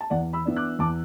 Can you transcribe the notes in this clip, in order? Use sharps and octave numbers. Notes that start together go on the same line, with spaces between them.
A5
E2 D5 F#5
B5 E6
E3 B3 D4
D6 F#6
E2 A5 D6